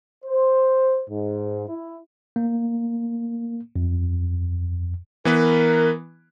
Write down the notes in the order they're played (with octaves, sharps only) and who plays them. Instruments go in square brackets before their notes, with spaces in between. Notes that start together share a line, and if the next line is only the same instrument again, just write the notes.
[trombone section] C5
G#2
E4
[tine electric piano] A#3
F2
[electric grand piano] E3 B3 B4 [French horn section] A#4